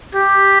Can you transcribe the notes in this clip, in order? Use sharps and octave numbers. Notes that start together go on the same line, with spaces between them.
G4